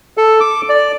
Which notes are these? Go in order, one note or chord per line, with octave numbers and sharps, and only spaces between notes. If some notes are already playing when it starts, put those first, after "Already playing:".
A4
D6
D5